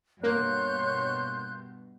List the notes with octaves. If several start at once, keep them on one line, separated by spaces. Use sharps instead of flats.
G2 B2 A#3 C#5 C6 F#6 G6